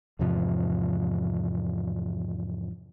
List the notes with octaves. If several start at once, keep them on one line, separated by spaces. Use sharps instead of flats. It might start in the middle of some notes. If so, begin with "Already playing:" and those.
E2 G#2 C3 F3